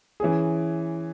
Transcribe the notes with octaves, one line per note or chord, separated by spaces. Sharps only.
E3 C#4 G#4